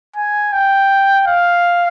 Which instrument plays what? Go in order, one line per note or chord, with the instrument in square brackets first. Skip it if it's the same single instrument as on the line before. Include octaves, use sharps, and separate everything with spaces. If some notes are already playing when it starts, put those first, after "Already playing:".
[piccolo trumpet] G#5
G5
F5